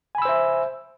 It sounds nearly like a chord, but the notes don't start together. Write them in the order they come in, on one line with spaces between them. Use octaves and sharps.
G#5 B5 E6 C5 E5